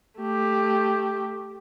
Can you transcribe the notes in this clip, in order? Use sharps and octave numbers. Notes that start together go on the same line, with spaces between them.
A3 G4